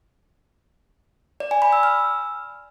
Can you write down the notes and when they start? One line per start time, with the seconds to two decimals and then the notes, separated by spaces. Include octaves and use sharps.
1.40 D5
1.51 G#5
1.62 B5
1.73 E6
1.83 F6